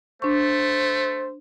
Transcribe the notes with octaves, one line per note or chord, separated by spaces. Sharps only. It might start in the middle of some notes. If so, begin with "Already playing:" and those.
A3 D4 C5 C#6